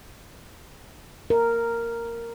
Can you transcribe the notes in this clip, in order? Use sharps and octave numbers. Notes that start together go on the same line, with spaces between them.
A#4